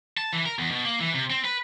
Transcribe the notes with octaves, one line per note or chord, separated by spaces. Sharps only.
A5
E3
A#4
E2
B2
A#3
E3
C3
C4
B4